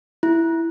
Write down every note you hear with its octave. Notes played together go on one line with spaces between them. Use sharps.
E4